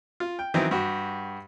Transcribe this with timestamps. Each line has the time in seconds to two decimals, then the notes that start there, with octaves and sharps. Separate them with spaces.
0.20 F4
0.39 G5
0.54 D#3 E3 F#3 B3 C4
0.71 G2 F#4 G4